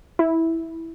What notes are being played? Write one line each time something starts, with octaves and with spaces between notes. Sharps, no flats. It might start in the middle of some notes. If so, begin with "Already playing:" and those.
E4